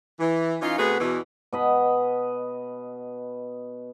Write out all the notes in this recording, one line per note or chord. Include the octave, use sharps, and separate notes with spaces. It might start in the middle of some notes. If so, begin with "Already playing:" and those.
E3
E3 C#4 D#4 F4
C3 A3 B3 F#4 G#4 B4
E2 B2 E3
B2 D#5 B5